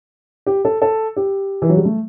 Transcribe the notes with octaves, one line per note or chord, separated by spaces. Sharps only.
G4
A4
A4
G4
E3
F#3
G3
A3